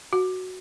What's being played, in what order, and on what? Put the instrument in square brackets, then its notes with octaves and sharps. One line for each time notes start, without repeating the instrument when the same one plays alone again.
[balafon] F#4